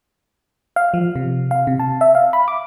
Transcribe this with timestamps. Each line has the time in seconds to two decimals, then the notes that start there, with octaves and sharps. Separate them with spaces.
0.76 F5
0.94 F3
1.16 C3
1.51 F5
1.67 C3
1.80 A5
2.01 E5
2.15 F5
2.33 B5
2.48 D6